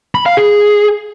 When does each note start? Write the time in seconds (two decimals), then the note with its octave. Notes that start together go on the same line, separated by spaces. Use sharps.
0.15 B5
0.26 F5
0.37 G#4